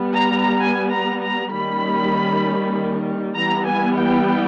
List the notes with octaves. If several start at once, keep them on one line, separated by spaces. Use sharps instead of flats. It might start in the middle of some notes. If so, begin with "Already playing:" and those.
Already playing: G3 B3
A#5
G#5
A#5
A#5
D#3 G3 A#3 C#4 B5
E3 G3 B3 A#5
G#5
G5